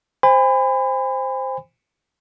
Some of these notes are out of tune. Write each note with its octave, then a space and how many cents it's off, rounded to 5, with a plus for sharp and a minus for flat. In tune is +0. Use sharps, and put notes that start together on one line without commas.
C5 +0 G#5 -40 B5 +30